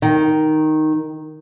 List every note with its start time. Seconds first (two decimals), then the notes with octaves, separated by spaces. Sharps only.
0.02 D#3